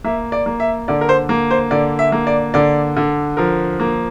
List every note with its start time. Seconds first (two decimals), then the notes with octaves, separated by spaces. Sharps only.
0.04 A#3 E5
0.32 D5
0.46 A#3
0.60 E5
0.88 D3 D5
1.01 A#4
1.09 C5
1.29 A#3
1.51 C5
1.71 D3 D5
1.99 E5
2.12 A#3
2.27 D5
2.54 D3 D5
2.97 D3
3.37 F3 A#4
3.80 A#3